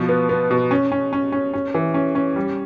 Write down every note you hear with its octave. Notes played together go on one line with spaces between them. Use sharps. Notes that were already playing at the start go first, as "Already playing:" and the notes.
Already playing: B2 F3
B3
B3
B2
C#4
C#4
C#4
C#4
C#4
E3
C#4
C#4
G3